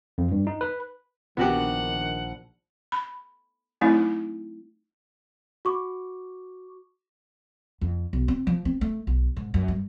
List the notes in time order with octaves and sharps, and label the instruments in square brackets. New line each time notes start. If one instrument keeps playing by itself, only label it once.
[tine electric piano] F2
G2
D#4
B4
[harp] A#1 [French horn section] D#3 [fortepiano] B3 F#4 G4 [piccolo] F#5
[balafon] B5
F#3 A3 C4 D#4 E4
[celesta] F#4 C#6 D6
[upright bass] F2
B1
C4
F3
C4
A3
B1
G#2
F#2
G2